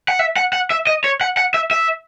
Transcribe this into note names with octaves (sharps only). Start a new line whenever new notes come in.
F#5
E5
F#5
F#5
E5
D#5
C#5
F#5
F#5
E5
E5